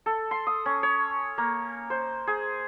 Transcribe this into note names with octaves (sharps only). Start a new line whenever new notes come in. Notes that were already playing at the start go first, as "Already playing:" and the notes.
A4
C6
D#6
C#4
C#5
A#3
C5
G#4